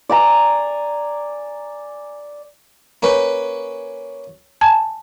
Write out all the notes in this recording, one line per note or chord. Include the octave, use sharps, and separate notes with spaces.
D5 G#5 A#5
A#3 C#4 B4
G#5 A5 G#6